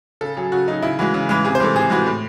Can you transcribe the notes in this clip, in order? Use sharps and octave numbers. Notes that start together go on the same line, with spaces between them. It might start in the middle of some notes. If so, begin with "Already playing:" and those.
C#3 A4
F#3 G#4
C#3 F#4
F#3 D#4
C#3 E4
E3 G#3 F#4
C#3
E3 G#3
C3 G#4
C5
E3 G#3 A4
C3 G#4
E3 G#3 F#4
A2